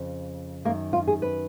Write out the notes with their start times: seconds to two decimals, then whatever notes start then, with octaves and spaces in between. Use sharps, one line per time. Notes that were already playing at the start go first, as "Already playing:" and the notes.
Already playing: F2 C#3
0.65 F#2 D#3 A#3
0.93 F4
1.07 G#4
1.22 B4